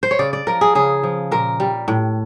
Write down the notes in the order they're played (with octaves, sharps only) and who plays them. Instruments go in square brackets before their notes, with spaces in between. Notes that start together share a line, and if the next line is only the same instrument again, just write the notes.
[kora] C5
C#5
C#3 D5
D5
F3 A#4
G#4
C#3 G#4
F3
A#2 A#4
G3
A2